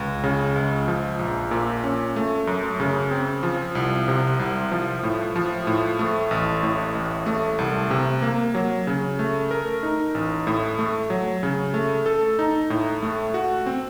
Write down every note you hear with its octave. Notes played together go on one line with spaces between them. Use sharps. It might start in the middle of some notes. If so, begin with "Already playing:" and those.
Already playing: C#2
C#3
C#2
F3
A#1
A#2
C#4
A3
F#2
C#3
C4
F3
C2
C3
C2
F3
A2
F3
A2
A3
A1
A2
A1
A3
C2
C3
A#3
F#3
C#3
A3
A#4
D#4
A1
A2
A3
F#3
C#3
A3
A4
D#4
A2
A3
F#4
C4